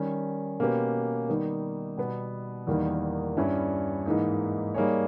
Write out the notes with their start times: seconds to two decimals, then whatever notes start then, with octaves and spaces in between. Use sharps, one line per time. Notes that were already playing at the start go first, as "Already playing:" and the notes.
Already playing: D#3 G3 C#4
0.59 B2 A#3 C#4 G4 B4
1.29 D#3 G3 B3 D#4
1.97 B2 G3 B3
2.67 E2 D#3 G3 A#3 D#4
3.37 G2 G3 C#4 E4
4.06 G#2 E3 A#3 D#4
4.74 G3 A#3 D#4 G#4 C#5